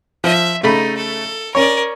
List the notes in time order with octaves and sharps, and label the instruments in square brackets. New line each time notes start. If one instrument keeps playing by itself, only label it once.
[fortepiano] F3 [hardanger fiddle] E5
[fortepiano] C#3 A3 B5 [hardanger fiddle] D#4
[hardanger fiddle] A4
[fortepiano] C#4 C#5 [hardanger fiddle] A#4 D5